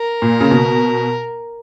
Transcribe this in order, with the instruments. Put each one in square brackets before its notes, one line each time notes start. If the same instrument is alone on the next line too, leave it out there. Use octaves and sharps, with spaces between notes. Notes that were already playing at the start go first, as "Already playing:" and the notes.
Already playing: [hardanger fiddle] A#4
[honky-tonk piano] A#2
C#3
B2